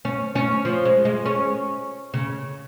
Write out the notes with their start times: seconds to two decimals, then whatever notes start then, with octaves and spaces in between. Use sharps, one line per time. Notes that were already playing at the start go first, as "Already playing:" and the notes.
0.05 C#4
0.35 C#4
0.65 F3
0.85 G#3
1.05 G#3
1.26 C#4
2.14 C#3